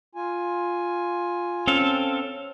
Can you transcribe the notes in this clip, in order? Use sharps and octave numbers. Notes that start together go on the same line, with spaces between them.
F4 G#5
C4 C#4 A4 F5